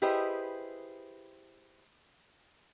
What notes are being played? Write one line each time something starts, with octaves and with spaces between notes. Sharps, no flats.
E4 G4 G#4 B4 C5 D#5